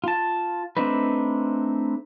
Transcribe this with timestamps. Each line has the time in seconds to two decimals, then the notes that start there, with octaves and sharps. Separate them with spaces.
0.04 F4 A5
0.77 A3 C4 D4 D#4 B4